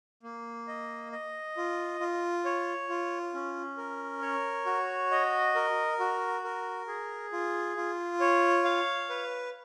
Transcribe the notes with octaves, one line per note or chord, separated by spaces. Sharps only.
A#3
D#5
D#5
F4
F4
C#5
F4
C#4
A#4
C#5
F#4
D#5
A#4
F#4
A#4
G#4
F4
F4
C#5
F5
B4